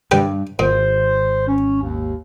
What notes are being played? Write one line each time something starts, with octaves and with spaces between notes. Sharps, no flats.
G2 G3 B4 G5
G#1 A#2 C5
C#4
D#2